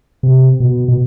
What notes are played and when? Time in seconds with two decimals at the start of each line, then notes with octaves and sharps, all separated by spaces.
0.23 C3
0.60 B2
0.88 B2